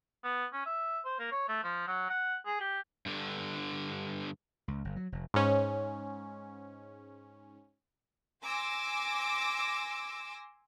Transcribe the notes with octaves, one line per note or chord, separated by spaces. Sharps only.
B3
C#4
E5
C5
A#3
C#5
A3
F3
F#3
F#5
G#4
G4
G2 D3
C#2
G1
F#3
F1
G#2 C#4
G#5 C6 D6 E6 A#6